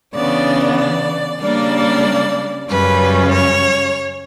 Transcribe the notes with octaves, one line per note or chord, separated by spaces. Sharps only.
C#3 E3 B3 D4 D5
D5
C#3 G3 A#3 D4 D5
F#2 C#3 G3 C#4 B4
C#5